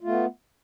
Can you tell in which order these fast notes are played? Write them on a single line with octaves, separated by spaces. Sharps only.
F4 A3 B3